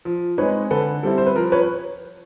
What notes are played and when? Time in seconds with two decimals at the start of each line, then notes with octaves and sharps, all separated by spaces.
0.05 F3
0.38 G#3 C4 D#4 B4 C#5
0.71 D3 A4 B4
1.03 G3 C4 E4 A4
1.18 C5
1.26 B4
1.36 F3 A#4
1.52 B4 C#5